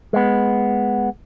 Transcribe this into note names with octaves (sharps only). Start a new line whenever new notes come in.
G#3 B3